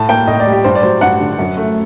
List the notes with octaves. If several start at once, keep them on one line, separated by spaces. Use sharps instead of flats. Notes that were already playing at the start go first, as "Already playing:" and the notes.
Already playing: A2 A5
A#3 G5
A2 D#5
D5
G3
G4
G2 C5
D5
F#3 C5
G2 F#5
D3
F#2
A3